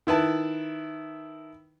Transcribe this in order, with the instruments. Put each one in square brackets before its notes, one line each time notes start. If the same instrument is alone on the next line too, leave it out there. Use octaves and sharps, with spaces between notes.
[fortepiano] D#3 E4 B4 A5